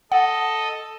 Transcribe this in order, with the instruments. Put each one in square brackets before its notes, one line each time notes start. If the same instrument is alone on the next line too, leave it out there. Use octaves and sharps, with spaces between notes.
[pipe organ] A4 D#5 [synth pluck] F#5